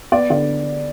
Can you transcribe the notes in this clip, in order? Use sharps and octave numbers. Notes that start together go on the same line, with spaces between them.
B3 D5
D3 D5